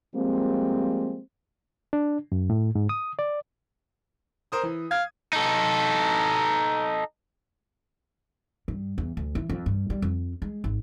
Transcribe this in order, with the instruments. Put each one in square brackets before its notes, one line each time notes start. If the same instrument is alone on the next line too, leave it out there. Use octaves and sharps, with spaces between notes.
[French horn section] F3 G3 G#3 A#3 C4
[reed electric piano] D4
F#2
A2
G#2
D#6
D5
[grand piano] A#4 C5 D#6
E3
[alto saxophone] F5 [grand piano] G#6
[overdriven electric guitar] D#4 A4
[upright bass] G2
E2
D2
E3
F2
G2
G3
F2
G#3
G#1